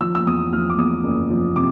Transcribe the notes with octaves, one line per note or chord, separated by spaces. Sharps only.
F3 E6
E6
E2 D#6
F3 F6
D6
E2 D#6
F#1
F3
C3 D6